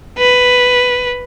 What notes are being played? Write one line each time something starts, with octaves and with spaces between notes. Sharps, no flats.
B4